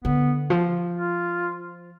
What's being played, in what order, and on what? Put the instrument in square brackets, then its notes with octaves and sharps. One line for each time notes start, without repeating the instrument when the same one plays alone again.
[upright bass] D3 [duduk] B3
[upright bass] F3
[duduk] F4